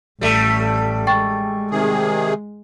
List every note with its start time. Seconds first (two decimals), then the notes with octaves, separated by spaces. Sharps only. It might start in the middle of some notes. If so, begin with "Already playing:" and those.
0.21 A1 A2 G3 A3
1.07 G#3 G5 C#6 A6
1.71 C3 D#3 G#4